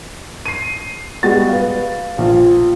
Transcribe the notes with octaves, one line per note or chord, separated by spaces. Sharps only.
C7 D#7
G3 G#3 B3 F#4 A6
B4 F5
A#1 F4